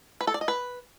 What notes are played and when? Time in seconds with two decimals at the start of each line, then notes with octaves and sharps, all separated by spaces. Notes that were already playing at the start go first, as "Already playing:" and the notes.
0.21 B4
0.27 A4
0.34 D5
0.41 D#5
0.48 B4